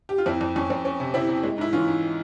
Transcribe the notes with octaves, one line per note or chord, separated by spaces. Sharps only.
G4
F4
F2 C4 E4
F2
F2 C#4
F2 C4
C4 C#4
C3
C3 C4 E4
C3
G#3
G#2 E4
E3 C#4 F4
G#2